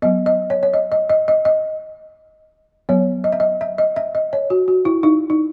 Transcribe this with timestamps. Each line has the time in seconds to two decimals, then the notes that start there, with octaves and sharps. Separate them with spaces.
0.02 F#3 B3 D#5
0.26 D#5
0.50 C#5
0.63 C#5
0.74 D#5
0.92 D#5
1.09 D#5
1.28 D#5
1.45 D#5
2.89 F#3 B3 C#5
3.24 D#5
3.32 E5
3.40 D#5
3.61 E5
3.78 D#5
3.96 E5
4.15 D#5
4.33 C#5
4.50 F#4
4.68 F#4
4.85 E4
5.03 D#4
5.30 D#4